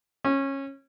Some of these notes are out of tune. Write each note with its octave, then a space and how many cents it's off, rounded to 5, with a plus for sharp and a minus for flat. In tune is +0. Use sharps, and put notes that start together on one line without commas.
C#4 -20